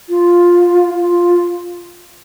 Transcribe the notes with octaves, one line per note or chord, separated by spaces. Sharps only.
F4
F4